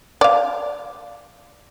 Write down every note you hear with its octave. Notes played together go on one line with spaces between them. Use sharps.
D5 F5